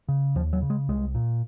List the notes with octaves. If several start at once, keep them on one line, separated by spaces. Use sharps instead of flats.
C#3
D#2 F3
F#3
C#3
G#3
C2 G#3
A#2